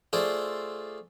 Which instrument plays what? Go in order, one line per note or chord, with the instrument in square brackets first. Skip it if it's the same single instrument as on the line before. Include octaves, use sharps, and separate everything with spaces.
[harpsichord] A3 F4 G#4 A4 C5 D5